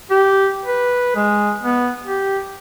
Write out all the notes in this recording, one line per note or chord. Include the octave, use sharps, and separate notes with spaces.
G4
B4
G#3
B3
G4